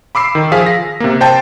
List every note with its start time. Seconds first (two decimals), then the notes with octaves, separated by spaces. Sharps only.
0.15 B5 D6 E6 C7
0.35 D#3
0.52 F3 G#4 F5 B6
0.66 A#6
1.00 C3 A#3
1.21 C5 G5 A5